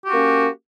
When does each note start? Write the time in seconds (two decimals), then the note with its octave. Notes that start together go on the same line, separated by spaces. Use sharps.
0.05 G4
0.08 F#4
0.10 C#4
0.13 A#3